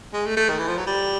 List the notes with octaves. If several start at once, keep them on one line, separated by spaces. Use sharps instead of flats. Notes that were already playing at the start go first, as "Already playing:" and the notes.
G#3
A3
A3
D#3
E3
F3
F#3
G3